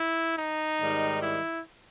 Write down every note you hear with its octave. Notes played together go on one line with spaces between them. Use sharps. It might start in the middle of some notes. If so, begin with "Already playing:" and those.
Already playing: E4
D#4
G#2 D#3 G3
E4